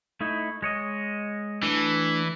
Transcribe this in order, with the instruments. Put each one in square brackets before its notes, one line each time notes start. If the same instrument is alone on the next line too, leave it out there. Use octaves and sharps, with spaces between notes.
[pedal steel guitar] A3 D#4 E4
G#3 C#5 D#5
[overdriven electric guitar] E3 [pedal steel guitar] A3 D4